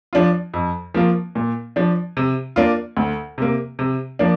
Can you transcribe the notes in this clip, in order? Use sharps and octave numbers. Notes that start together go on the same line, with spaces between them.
F3 D4 F4
F2
F3 A#3 F4
A#2
F3 D4
C3
A#3 D4 F4
D2
C3 A#3
C3
F3 A#3 D4